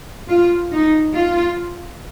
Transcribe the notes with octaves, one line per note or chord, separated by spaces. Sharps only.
F4
D#4
F4